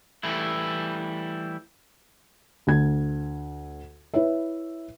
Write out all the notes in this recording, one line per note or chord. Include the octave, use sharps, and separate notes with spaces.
E3 G3 A3 E4
D2 G#6
E4 B4 C#5 E5